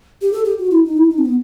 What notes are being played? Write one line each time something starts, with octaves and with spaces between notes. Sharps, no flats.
G4
A4
G4
F#4
E4
D#4
E4
D#4
C4
B3